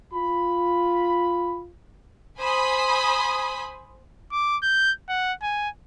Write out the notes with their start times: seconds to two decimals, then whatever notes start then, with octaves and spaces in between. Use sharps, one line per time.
0.14 F4 B5
2.38 C5 G#5 B5 D#6
4.32 D6
4.63 G6
5.09 F#5
5.42 G#5